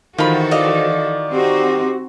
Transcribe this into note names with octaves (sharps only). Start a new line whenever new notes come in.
D#3 E3 F4 F#4 A4 C5 B5
D5 D#5 F5
C4 D#4 F#4 G4